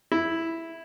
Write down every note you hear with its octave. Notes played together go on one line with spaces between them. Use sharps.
E4